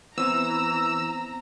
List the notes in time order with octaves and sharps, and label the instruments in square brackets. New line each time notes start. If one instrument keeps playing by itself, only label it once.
[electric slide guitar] E3 [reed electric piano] B3 C4 C5 [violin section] A#5 [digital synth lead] E6